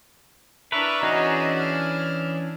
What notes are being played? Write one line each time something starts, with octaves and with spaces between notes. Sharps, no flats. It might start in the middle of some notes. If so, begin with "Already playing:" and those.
D4 E4 A#4 B4 E5 C#6
E3 C#4 D#4 F#4 G#4 D#5
F6